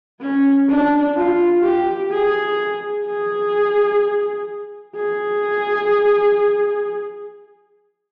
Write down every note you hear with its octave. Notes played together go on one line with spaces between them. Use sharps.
C#4
D4
F4
G4
G#4
G#4
G#4